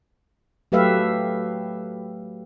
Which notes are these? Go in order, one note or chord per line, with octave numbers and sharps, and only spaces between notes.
F#3 A3 G4 B4 E5 F5